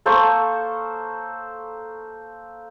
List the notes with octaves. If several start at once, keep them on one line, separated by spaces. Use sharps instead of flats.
A#3 A4 C5 C#6